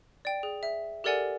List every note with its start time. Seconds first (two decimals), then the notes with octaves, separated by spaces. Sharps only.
0.25 D5 G5
0.43 G#4
0.63 E5
1.04 G4 A4 A#4 D5 F#5 G#5